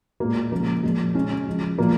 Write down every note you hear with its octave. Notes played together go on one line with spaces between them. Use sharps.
A#2 G#3 A#3
C#3 F3 G#3 A#3
A#2 F3 G#3
C#3 G#3 C#4
C#3 F3 G#3
A#2 F3 G#3 A#3